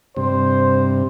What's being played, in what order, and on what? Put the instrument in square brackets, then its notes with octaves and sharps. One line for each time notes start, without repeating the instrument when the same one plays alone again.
[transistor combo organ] G2 C3 [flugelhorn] C5